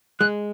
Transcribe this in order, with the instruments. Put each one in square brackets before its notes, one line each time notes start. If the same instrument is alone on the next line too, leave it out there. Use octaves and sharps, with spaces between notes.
[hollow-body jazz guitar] G#3 [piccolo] F#6